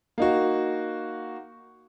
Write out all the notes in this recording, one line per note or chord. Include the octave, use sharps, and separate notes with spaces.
A#3 D#4 F#4